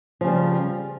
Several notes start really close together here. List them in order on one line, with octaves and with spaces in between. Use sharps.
F3 C#3 G3